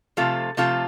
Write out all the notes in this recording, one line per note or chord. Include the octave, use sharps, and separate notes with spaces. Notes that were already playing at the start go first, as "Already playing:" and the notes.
C3 F3 A3 F4 A4
C3 F3 A3 F4 A4